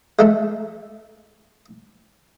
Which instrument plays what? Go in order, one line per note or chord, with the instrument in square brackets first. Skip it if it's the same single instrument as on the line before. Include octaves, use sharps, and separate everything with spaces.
[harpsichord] G#3 A3 A4